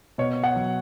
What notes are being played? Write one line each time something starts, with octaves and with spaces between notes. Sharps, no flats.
B2 C#5
F#5
F#3